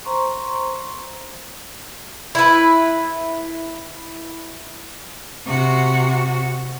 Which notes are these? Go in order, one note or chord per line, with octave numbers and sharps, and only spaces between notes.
C5 A#5 C6 C#6
E4 B4
C3 F#4